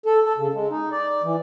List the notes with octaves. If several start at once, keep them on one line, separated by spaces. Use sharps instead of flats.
A4
A4
C#3
G#3
D#4
D5
E3